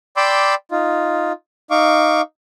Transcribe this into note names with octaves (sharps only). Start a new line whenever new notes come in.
D5 G5 B5 C6 D6 E6
D#4 F4
D#4 F5 C#6 D6